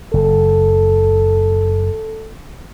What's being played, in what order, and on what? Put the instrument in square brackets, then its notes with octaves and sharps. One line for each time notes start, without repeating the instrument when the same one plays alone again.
[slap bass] F#1 [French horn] A4